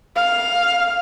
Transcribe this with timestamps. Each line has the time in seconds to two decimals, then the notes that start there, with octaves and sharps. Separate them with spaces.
0.16 F5